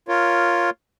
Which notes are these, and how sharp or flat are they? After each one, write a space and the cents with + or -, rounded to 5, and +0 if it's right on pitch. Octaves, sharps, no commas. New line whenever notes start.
F4 +0 A#4 +0 C#5 +0